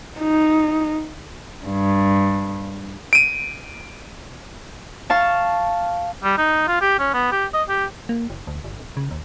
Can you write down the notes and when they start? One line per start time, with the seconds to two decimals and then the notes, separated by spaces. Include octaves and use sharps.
0.20 D#4
1.65 G2
3.13 D7 D#7
5.10 F5 A5 C#6
6.24 G3
6.38 D#4
6.68 F4
6.81 G4
6.99 C#4
7.14 B3
7.32 G4
7.54 D#5
7.69 G4
8.09 A#3
8.30 F#1
8.47 D2
8.64 G1
8.79 D1
8.97 C#3
9.11 D#2